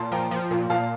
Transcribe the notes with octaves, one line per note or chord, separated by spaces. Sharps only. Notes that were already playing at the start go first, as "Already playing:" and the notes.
Already playing: A#2 A5 C6
F3 G5 A#5
F3
A#2
A#2 F5 A5